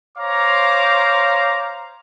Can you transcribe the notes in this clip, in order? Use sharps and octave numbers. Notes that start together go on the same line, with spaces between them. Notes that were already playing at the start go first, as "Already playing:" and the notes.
C5 C#5 F5 A#5 D6